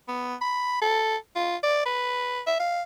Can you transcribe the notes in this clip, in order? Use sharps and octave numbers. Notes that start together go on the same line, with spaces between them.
B3
B5
A4
F4
D5
B4
E5
F5